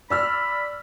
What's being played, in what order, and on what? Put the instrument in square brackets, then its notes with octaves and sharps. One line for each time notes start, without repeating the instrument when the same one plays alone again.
[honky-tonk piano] D5 E6 F6 [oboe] B5